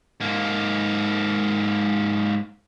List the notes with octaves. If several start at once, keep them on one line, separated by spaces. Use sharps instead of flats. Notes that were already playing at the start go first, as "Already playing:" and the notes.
G#2 A#3